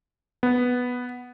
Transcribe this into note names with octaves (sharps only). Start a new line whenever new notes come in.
B3